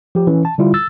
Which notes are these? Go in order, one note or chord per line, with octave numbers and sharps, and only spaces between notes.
F3 G4
E3 C#4
A5
D3 G3 E4 F4
E6 A6